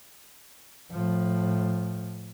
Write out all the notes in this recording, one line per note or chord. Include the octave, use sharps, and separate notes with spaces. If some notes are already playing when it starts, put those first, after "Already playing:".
A2 F3